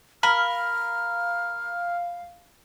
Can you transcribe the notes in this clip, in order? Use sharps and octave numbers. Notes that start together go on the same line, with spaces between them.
A#4 F5 B5 F6